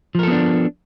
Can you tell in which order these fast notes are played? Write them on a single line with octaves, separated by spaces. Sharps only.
F3 A#4 A4 B3 D4